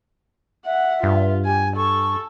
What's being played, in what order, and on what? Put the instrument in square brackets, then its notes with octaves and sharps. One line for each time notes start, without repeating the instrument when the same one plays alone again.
[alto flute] E5 [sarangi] F#5
[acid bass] G2 [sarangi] F4
[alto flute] G4 [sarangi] G#5
[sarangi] A4 [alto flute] C#6